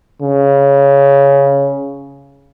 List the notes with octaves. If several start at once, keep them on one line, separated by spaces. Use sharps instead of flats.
C#3